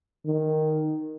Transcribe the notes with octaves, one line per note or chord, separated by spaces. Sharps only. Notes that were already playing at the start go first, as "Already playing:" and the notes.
D#3